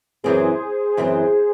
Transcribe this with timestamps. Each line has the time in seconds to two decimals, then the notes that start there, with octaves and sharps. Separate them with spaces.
0.24 F#2 E3 C4 G#4 C5
0.97 F#2 E3 C4